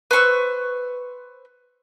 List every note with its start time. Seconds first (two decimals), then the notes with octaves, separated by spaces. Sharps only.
0.11 B4 C5 C#6 E6